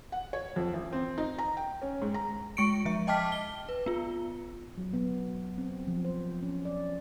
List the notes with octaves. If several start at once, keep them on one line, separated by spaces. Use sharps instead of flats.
F#5
C#5
F2
A1
C4
D#4
A#5
G5
C#4
G#2
A#5
G#3 C#6 C#7 D7
F3 E5
D#5 G5 A5 D6 F6 B6
G7
B4
B3 F4
F#3
B3
C4
F3
C5
C#4
D5